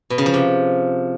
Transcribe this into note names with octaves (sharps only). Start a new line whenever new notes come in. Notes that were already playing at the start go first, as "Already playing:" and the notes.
B2
C#3
F3
C3